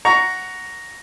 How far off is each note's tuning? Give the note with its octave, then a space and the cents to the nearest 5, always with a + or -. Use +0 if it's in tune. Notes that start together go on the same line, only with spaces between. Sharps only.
F#5 +0 A#5 +0 C#6 +15